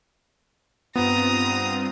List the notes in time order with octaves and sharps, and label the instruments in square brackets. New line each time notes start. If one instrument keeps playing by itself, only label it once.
[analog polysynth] G2 C4 F4 [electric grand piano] B3 [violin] A#5 D#6